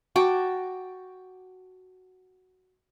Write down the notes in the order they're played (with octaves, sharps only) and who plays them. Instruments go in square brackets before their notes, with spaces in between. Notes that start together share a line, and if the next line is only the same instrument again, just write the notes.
[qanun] F#4 G5 A5 D6